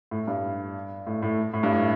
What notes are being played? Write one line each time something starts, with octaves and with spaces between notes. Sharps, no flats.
A2
G2
A2
A2
A2
G2
A2